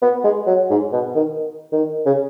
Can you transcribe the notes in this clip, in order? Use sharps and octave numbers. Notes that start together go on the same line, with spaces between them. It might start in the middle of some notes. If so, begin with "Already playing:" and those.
B3
G#3
F#3
G#2
B2
D#3
D#3
C#3